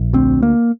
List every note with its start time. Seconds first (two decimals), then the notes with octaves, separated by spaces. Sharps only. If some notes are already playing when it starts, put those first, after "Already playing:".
Already playing: A#1
0.13 D2 C4
0.43 A#3